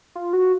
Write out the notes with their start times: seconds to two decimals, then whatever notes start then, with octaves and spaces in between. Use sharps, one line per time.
0.15 F4
0.33 F#4